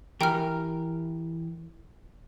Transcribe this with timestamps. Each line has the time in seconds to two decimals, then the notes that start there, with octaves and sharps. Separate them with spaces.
0.21 E3 G4 A#4 G5 F6